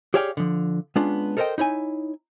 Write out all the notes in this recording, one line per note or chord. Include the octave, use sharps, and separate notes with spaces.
G4 G#4 C#5 D5 F5 G5
D3 F3
G#3 B3 C#4 D4 F4
A4 A#4 C5 C#5 D#5 G5
D#4 E4 C#5 G#5